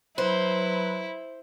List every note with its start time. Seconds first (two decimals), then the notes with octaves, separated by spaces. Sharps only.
0.18 F#3 E4 B4 C5